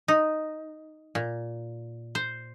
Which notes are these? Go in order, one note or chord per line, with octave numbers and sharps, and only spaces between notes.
D#4
A#2
C5